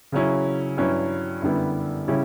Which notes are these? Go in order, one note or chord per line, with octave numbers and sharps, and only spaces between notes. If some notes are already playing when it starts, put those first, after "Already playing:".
C#3 F#3 C#4 E4
G2 F#3 C#4 E4
F#2 D3 G3 B3 E4
C#3 G3 C#4 E4